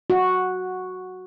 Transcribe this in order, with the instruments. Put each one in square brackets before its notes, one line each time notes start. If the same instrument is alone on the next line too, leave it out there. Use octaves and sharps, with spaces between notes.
[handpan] F#4